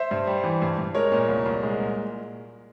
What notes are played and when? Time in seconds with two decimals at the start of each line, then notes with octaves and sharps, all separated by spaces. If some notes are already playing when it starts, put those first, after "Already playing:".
Already playing: C5 E5
0.11 G2
0.27 G3
0.44 E3
0.62 G2
0.78 G2
0.95 G#3 A#4 C#5
1.12 A#2
1.28 C2
1.46 C2
1.63 G#3
1.79 A#2